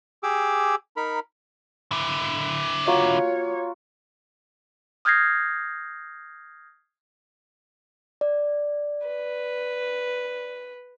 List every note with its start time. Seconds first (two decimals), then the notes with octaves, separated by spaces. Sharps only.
0.23 G4 G#4 D6 E6
0.97 D#4 A#4 B5
1.91 D3 E4
2.87 A#3 F4 F#4 C#5
5.05 D#6 F6 G6 G#6 A#6 C7
8.21 D5
9.07 B4